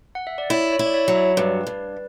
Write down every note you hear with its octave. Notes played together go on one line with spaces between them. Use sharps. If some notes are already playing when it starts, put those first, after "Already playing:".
F#5
E5
D5
E4 C#5
C#5
E4
D5
C#5 E5
F#3
C#5 E5
G2 B4 D5
G2